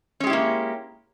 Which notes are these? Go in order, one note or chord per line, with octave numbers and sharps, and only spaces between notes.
G#3 A#3 C#4 E4 G4